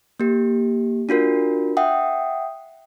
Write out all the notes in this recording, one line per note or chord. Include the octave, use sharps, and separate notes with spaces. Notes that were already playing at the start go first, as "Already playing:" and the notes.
A#3 G4
D4 F4 F#4 A#4
E5 F#5 G5 D#6